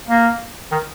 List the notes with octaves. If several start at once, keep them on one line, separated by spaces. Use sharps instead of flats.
A#3
D#3